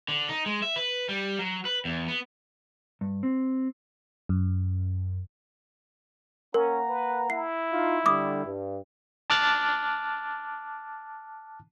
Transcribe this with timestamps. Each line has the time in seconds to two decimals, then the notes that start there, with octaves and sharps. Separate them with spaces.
0.08 D3
0.29 D#4
0.46 G#3
0.62 E5
0.76 B4
1.09 G3
1.39 F#3
1.65 B4
1.85 E2
2.08 B3
3.01 G2
3.23 C4
4.29 F#2
6.54 A#3 C#4 A#4 F#5 A#5
6.89 B4
7.30 E4 C7
7.72 D#4 F4
8.06 D3 G3 D6 D#6
8.44 G2
9.30 A5 D6 F6 F#6 A6